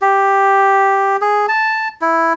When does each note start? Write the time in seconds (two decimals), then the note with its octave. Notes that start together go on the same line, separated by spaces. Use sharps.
0.01 G4
1.21 G#4
1.48 A5
2.01 E4